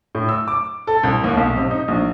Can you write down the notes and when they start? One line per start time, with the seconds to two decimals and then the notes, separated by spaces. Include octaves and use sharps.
0.15 A2
0.29 E6
0.48 D6
0.87 A4
1.04 C2
1.24 D#2
1.37 B1
1.57 C3
1.71 D#4
1.88 A#1